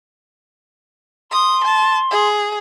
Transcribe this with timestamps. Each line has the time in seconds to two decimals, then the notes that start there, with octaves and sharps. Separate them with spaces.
1.32 C6 D#6
1.64 A5
2.11 G#4